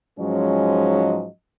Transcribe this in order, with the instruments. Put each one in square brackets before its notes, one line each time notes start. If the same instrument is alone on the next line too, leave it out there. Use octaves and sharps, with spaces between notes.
[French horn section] G#2 F3 F#3 G#3 C#4 D#5